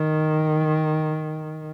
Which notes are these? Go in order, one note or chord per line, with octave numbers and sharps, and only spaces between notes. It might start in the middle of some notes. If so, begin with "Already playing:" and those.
Already playing: D#3